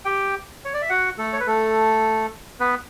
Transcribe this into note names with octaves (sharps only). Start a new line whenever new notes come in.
G4 G5
C#5
D5
E5
F#4 F#5
A3 A4
C#5
B4
A3 A4
B3 B4